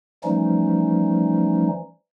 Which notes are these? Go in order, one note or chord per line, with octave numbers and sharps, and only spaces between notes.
E3 F3 G3 A3 C#4 D#4